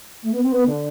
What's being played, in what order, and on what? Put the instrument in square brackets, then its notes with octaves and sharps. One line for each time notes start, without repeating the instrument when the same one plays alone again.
[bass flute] A3
B3
C4
B3
D3